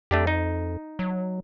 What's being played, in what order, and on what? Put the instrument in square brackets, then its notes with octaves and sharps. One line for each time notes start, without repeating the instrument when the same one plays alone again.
[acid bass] F2 [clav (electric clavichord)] A3 D4 G4
[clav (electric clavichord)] D#4
[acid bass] F#3